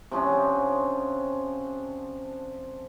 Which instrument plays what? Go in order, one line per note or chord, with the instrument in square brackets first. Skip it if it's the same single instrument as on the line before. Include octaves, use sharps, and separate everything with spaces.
[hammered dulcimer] C3 F3 C#4 D4